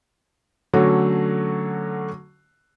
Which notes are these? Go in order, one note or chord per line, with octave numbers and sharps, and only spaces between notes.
D3 F#3 A3 C#4 F#4